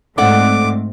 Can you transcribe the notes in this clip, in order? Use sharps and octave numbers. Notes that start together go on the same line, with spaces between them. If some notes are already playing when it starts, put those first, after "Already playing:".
G#2 A3 C4 A4 D5 F#5 D6